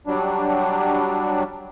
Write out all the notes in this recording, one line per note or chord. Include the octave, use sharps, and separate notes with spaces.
F#3 G3 D4